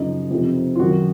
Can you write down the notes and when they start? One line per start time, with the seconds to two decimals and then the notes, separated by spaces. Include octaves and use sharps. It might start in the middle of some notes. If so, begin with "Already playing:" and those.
Already playing: F#2 C#3 F3 D#4
0.30 F2 C3 F3
0.76 F4
0.79 F#2 D#3 F#3 F#4